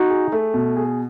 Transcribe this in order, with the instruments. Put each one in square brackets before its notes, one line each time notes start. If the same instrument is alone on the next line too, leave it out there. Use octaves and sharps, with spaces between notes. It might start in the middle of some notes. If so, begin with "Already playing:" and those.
Already playing: [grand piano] D#4 [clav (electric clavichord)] F#4
[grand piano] G#4
A3
B2
G#4